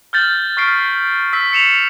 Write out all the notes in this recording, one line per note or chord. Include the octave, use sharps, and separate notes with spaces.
F6 G6 A6 F#7
C#6 F6 B6 C7 D7
E6 B6
C#7 E7 F7